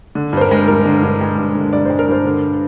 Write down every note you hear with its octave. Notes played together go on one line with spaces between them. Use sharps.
D3
G2 C5
A#4
G#3
G2 A#4
D3
G2
G#3
G2
D3
G2 D5
G#3 C5
A#4
G2 C5
D3